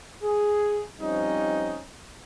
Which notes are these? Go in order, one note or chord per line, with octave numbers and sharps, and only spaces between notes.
G#4
F3 G3 C4 C#4 D#4